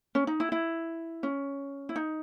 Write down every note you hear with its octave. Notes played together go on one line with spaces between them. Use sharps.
C#4
D#4
E4
E4
C#4
E4
D#4